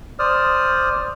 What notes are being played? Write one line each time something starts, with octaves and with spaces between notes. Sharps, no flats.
C5 D5 D#6 F6